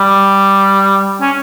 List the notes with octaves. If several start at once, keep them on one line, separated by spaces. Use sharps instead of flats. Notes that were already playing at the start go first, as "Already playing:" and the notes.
Already playing: G3
C#4